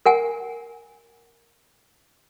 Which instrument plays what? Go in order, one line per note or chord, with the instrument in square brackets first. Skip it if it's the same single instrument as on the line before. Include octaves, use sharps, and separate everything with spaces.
[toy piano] A#4 F#5 G#5